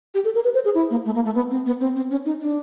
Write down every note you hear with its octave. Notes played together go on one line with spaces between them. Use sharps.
G4
A4
A#4
B4
C5
G#4
E4
A#3
A3
A#3
A3
B3
C4
B3
C4
C4
C#4
D#4
D4